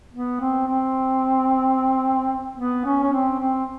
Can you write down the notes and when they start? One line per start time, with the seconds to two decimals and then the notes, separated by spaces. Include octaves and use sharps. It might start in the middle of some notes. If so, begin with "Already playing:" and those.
0.13 B3
0.40 C4
0.68 C4
2.58 B3
2.85 C#4
3.03 C#4
3.12 C4
3.39 C4